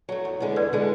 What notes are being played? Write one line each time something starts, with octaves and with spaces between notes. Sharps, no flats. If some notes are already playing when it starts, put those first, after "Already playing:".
F#3 A3
E2
D3 G#3 B3
E2 B4 D5
D3 G#3 B3